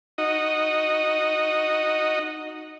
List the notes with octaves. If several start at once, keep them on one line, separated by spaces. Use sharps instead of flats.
D#4 F#4 D#5